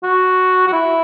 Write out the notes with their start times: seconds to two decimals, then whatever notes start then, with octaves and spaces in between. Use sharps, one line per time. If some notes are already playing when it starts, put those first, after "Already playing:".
0.03 F#4
0.67 F#4
0.72 E4